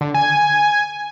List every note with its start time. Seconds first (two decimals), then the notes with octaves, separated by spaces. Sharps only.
0.01 D3
0.14 G#5